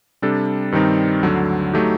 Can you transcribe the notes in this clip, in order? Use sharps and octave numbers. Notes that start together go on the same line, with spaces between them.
C3 G3 D4 A4
G2 D#3 G3 C4 D#4
D2 D3 F#3
F#3 A3 D#4 G4